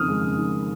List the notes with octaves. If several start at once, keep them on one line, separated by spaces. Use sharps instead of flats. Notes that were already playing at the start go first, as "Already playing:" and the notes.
Already playing: F#1 F2 D#3 D#6 F6
G#3
F#1
D#3